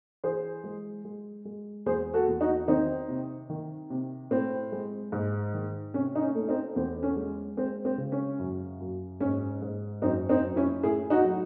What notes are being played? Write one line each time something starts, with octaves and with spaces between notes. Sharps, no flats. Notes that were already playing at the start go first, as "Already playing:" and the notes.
E3 G#4 C5
G#3
G#3
G#3
E2 G#4 C5
F#4 A4
E2
D#4 F#4
D#3 C4 D#4
C3
D#3
C3
A2 C4
G#3
G#2
D#3
C3 C#4
D#4
C#4
A3
C4 D#4
E2 C4
C#4
G#3
G#3 C4
C4
C#3
C#4
F#2
F#2
G#2 C#4
G#2
F#2 C4 D#4
C4 D#4
F#2
C#4 E4
A2 E4 G#4
D#4 F#4
F#3